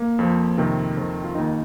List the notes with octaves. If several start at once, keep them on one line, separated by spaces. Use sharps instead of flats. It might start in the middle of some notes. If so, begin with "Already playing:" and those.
Already playing: A#3
F2 F3
F2 C3 D#3 C4
F2 D#3
F4
D#2 D#3 D#4